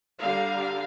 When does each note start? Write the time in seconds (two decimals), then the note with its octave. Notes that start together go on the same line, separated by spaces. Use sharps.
0.20 D3 G3 F5 A#5